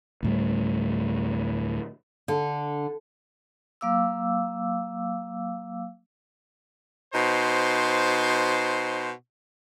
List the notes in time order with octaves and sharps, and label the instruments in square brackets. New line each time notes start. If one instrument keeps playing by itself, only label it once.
[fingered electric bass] D2 A2 G3
[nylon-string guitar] D3
[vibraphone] F#3 A#3 F5 D6 E6
[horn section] B2 D#4 C5